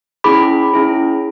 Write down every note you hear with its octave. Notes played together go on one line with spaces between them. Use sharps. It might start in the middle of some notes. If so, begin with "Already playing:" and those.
C#4 E4 G#4 B5 D6
C#4 E4 G#4